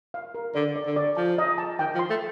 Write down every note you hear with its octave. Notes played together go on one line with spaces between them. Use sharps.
F5
A#4
D3 D5
D5
D3
D5
F3 A5
D#5
A5
D#3 G5
F3
C6
A3